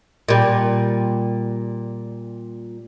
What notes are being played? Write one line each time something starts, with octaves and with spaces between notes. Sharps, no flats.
A#2 G3